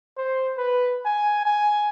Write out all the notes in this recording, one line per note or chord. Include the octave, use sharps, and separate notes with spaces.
C5
B4
G#5
G#5